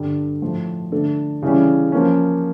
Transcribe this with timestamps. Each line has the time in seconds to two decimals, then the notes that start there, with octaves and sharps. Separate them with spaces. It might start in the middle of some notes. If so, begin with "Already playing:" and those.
Already playing: G2 D3 G3
0.42 A2 F3 A3
0.92 D3 A3 D4 A4
1.42 C#3 E3 G3 C#4
1.92 F3 A#3 C#4